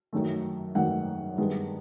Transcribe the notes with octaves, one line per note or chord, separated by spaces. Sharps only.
F#2 D#3 F#3 A3
F#2 D#3 F#3 A3 F#5
G2 D#3 G#3 B3